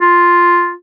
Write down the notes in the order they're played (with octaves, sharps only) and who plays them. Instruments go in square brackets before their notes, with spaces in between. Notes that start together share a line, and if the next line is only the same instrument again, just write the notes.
[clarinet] F4